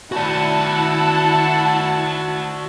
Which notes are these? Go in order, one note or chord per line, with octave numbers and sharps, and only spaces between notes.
E4 F#4 D5 F#5 A5